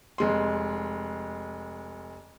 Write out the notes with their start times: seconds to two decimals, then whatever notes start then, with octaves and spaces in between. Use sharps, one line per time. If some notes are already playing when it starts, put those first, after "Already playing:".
0.18 F1 G#3 C6